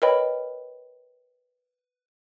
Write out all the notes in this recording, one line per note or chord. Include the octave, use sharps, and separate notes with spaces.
A#4 B4 C#5 D#5 G5 B5